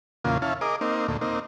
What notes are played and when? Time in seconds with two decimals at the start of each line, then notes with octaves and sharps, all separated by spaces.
0.24 E2 A#2 C#3 A#3 F4
0.42 C#4 E4 F5 A5
0.61 G#4 A#4 D#5 D6
0.81 A#3 C4 D#4
1.08 D2 A#2 A3
1.21 A#3 C4 D#4